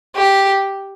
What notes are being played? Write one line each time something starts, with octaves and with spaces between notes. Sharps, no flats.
G4